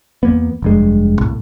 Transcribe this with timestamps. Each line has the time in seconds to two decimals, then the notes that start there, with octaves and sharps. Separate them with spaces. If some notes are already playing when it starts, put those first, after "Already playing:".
0.23 E2 A#3 B3
0.62 F1 G2 G#3
1.19 C2 A2